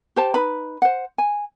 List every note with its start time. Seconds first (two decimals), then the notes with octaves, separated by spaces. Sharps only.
0.16 G4 C5 A5
0.34 D#4 B4 B5
0.82 C5 F#5
1.18 G#5